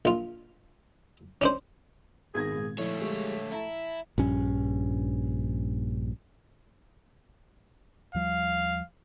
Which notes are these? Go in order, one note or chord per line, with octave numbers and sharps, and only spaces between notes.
A#1 F4
C#4 D4 C5
G#1 B3 D#4 G#4 G#6 A#6
A#2 G#3
D3 F3 A3 E4 C#5
G3 G#3
E4 A5 A#5
A#1 G2 C#4
D#2 F3 G3 F5